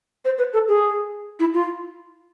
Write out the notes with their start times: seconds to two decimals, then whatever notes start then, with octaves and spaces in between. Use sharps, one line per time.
0.24 C5
0.38 B4
0.53 A4
0.68 G#4
1.39 E4
1.53 F4